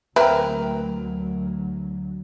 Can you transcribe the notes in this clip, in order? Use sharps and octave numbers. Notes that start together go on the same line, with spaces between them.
D2 F#3 A#3 C4 A#4 B4 E5 G5